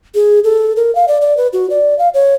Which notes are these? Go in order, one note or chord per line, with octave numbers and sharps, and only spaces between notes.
G#4
A4
A#4
F5
D5
D5
B4
F#4
D5
F5
C#5